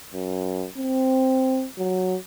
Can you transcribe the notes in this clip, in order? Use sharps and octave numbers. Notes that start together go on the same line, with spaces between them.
F#2
C4
F#3